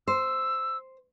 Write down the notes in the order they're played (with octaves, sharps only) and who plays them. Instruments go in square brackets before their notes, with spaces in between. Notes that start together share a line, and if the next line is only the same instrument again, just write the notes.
[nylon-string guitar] C5 [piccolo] E6